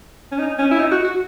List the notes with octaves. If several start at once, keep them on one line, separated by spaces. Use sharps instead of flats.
C#4
D#4
C#4
E4
D#4
F#4
F#4